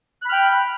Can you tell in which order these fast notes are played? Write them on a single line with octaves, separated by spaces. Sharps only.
F#6 B5 F6 G5